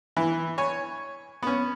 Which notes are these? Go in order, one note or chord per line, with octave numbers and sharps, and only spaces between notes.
E3
C#5 G#5
B3 C#4